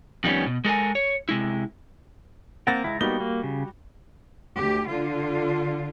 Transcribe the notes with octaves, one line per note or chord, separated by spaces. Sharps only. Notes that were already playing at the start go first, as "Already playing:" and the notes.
F2 D#3 G3 G#3 B3 C#4
B2
G#3 A4 A#4 G#5
C#5
C3 G#3 E4
A#3 C4 A#4 F#5 A6 A#6
C#2 E4
G3 A#3 B3 D#4 F#4 G7
A#3
C#3
D2 G4
D3 F4